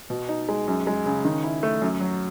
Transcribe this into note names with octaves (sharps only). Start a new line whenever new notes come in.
B2
D#4
G#3
F#2
G#3
C#3
D#3
E4
A3
F#2
F#3